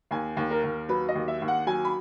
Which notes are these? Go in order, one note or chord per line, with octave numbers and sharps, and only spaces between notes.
D#2 G#5
D#2
A#4
D#2
F#3 B4
D#5
D#2
E5
D#2
F#5
F#3 G#5
B5